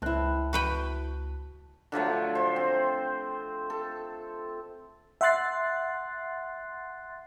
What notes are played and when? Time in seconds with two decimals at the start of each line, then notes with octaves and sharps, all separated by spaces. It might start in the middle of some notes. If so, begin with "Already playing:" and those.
0.02 C#2 C4 E4 A5 F#6
0.53 F#4 B4 G5
1.92 D3 F3 F#3 A3
2.35 C5
2.56 C4
3.70 A4
5.21 E5 F#5 C6 F#6 A6 C7